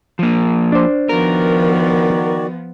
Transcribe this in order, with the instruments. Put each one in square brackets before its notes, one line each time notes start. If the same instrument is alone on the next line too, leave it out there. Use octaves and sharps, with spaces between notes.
[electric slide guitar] F3 A#3
[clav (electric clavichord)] D4 C5
[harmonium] D#3 F#4 D5 [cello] F3 B3 [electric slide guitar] A#4